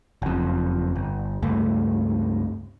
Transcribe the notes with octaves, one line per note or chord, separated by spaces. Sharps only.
F#1 F2
G1
C#2 G2 A3